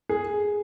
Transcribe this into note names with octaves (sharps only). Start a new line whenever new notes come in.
G#4